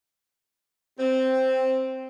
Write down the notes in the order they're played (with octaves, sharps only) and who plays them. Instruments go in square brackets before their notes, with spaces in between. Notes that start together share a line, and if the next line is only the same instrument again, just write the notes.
[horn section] C4